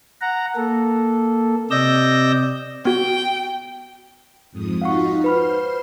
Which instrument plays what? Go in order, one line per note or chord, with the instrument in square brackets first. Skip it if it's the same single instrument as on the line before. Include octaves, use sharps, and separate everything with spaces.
[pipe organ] F#5 A#5
A#3 A4
C3 D5 D#5 E6 G6 A#6
[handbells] B3 F#4 [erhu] G5
[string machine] F2 G#2 D#6
[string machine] D#4 F4 F#4 [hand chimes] F5 F#5 C#6
[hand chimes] B4 B5 F6 [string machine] C5 C6